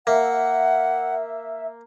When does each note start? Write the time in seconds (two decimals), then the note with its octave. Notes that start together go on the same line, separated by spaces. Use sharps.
0.07 A#3 E5 F#5